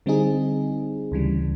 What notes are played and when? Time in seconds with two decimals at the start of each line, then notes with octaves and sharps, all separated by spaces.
0.06 D3 G3 C4 D#4 G#4
1.12 D2 C#3 E3 G3